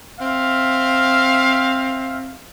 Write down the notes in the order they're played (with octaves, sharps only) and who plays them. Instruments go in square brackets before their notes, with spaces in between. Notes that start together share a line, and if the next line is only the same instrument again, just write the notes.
[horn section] C4 E5 F5